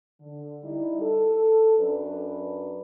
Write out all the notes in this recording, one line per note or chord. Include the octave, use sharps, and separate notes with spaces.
D3
G3 D#4 E4 G4
A4
F#2 D4 B4